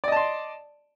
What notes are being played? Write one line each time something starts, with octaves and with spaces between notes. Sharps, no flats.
D5 D#5 A5 C6